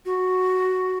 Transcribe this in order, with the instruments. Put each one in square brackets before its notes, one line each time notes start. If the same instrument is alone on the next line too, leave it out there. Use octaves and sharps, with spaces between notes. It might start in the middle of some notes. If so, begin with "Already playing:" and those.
[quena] F#4